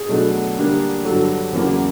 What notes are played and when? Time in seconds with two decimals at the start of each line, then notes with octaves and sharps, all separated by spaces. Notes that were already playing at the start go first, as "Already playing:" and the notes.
Already playing: G#4
0.09 B2 F#3 A3 D4
0.57 D3 G3 A#3 D4
1.05 G2 D3 F#3 A4
1.53 E2 C#3 F#3 A#3